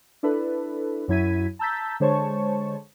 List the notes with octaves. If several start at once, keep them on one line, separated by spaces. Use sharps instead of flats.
D4 E4 A4 B4
F#2 F#3 E4 G#6 B6 D#7
A5 A#5 E6 G6 A6 B6
D3 G#3 C5 C#5 A5 C#6